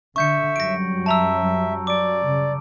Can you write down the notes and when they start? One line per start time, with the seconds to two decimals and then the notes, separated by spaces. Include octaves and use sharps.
0.16 D3 E5 C#6 G6 C#7
0.56 F#2 F#3 G3 A#6 D7
1.06 E5 A5 A#5 E6
1.87 D5 D6 D7
2.25 C#3